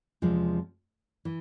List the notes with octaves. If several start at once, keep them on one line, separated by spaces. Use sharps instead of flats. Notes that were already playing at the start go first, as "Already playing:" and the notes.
E2 C3 F3 G#3 C#4
E3